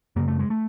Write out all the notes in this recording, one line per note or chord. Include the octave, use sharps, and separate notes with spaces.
F#2 C#3 A#3
A3
G#3
A3